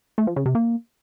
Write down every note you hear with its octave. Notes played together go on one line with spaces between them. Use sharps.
A3
F3
C#3
C3
A#3